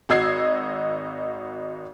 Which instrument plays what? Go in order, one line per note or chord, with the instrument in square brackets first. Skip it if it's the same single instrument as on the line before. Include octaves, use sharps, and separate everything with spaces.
[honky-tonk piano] G#1 F#4 D#5 E6 G#6 C7